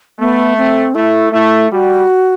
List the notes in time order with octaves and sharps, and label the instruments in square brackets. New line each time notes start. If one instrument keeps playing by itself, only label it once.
[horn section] A3 [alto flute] B3
[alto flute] C4
[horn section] A3 [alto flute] E4
[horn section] A3 [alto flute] E4
[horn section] G3 [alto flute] F#4